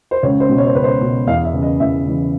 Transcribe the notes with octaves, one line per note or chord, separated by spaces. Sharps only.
C5
C#2 C#5
C5
B2
C#5
C5
C#2 B4
C5
B2
E2 F5
E5
C#3 E3
D#5
E2 E5
C#3 E3